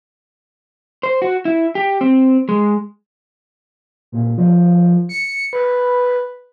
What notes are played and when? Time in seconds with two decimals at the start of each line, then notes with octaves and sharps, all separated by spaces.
1.03 C5
1.22 F#4
1.45 E4
1.75 G4
2.01 C4
2.49 G#3
4.12 A#2
4.38 F3
5.09 C#7
5.53 B4